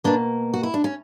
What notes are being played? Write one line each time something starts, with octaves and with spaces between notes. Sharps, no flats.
B2 A#3 B3 D4
F#4
E4
D4
C#4